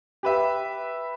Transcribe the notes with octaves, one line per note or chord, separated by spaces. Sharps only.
G4 B4 E5